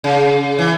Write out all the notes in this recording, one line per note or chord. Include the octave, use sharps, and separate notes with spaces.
C#3
E3